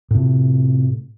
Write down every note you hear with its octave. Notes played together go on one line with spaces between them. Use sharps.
A2 C3